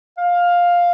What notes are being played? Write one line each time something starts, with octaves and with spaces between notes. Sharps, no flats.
F5